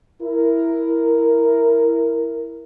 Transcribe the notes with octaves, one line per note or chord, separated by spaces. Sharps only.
E4 A#4